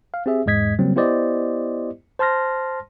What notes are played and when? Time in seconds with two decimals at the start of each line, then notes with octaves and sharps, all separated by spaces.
0.14 F5
0.26 C4 G4 G#4 E5
0.46 E2 G#2 G#3 D#5 G#6 B6
0.79 C#3 F#3 G3 A#3 C4
0.96 B3 E4 G4 C5 D5 D#5
2.19 C5 A5 C6 F6 A#6